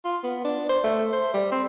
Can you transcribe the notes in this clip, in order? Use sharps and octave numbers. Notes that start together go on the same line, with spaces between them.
F4
B3
D4
C5
A3
C5
G3
C4